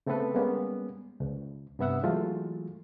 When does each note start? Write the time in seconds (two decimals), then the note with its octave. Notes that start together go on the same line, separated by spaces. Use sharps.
0.06 C#3 A3 B3 C4 A4 B4
0.35 G3 G#3 A#3 B3 C#4
1.20 C#2
1.79 G2 C3 B3 E5 F#5 E6
2.03 E3 F#3 G#3 A3 F4